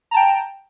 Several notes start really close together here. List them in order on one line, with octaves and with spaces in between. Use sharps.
A#5 A5 G5